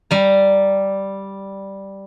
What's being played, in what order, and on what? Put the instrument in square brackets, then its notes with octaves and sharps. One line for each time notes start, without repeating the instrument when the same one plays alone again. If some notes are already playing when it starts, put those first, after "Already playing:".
[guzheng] G3 A#5